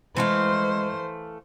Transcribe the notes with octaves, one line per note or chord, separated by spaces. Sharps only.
E3 G#3 A3 C5 F5